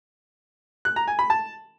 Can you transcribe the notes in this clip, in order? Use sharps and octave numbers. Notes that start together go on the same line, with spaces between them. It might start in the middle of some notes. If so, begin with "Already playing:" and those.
F#6
A#5
G#5
B5
A5